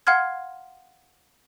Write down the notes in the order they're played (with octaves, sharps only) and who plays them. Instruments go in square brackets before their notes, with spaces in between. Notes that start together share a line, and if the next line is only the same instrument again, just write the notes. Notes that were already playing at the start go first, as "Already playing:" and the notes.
[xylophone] F5 F#5 C6 F6 G#6